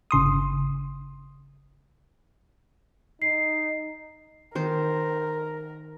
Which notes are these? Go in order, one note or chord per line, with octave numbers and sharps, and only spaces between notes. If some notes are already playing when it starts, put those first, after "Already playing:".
G1 C#3 C6 D#6
D#4 C7
D#3 A#4 C5